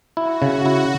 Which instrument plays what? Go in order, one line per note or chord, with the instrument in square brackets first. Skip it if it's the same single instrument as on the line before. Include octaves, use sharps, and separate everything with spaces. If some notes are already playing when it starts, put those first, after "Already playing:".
[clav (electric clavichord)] E4 [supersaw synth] F#4
[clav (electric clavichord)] C#3
E4